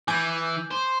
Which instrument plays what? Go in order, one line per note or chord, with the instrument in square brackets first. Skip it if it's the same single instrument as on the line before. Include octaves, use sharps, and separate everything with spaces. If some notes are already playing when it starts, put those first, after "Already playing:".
[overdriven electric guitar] E3 [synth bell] G#5 D6 G6
[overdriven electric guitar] C5